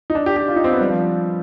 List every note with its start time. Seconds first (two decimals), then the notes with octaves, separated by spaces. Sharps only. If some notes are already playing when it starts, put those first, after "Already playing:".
0.10 D#4
0.15 D4
0.26 G4
0.37 G4
0.48 F4
0.56 D#4
0.64 C4
0.72 B3
0.81 G3
0.89 F3